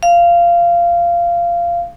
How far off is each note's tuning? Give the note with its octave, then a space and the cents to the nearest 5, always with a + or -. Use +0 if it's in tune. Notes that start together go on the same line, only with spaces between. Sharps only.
F5 -15